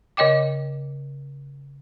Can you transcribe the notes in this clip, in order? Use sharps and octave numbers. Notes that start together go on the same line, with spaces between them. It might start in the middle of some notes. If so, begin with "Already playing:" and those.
C#3 C#5 D#5 G5 D6